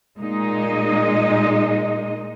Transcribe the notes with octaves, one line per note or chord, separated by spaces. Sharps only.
A#2 G#3 D#4 D#5